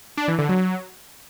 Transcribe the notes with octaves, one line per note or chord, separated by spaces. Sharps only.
D4
E3
D3
F#3